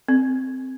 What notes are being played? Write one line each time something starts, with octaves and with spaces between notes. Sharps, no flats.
C4